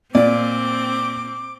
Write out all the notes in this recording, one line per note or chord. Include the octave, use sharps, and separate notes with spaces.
A#2 C4 D5 D6